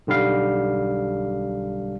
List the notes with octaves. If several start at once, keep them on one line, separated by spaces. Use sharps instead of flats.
B1 D3 G3 F5